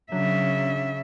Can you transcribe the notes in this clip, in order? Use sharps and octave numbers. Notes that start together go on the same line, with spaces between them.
C#3 F#3 D4 E5